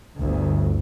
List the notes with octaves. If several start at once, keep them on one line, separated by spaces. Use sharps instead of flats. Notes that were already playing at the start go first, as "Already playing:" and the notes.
G1 D2